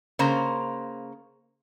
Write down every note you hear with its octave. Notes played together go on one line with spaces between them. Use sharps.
C#3 A#3 C5 A#5